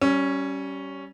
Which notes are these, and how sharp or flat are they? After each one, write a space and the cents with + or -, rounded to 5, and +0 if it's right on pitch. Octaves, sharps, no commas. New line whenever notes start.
G3 -25 C#4 +0